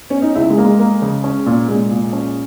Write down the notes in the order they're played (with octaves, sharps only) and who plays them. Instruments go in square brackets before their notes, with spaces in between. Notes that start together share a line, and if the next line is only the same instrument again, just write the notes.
[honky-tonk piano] C#4
D#4
[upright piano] C#2 [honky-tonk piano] E4
[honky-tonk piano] G#3
[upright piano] A#3
[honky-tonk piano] G#3
[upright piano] A#3
C#3
C#4
A#2
[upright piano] A#2 [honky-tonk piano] G#3
[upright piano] A#2
C#4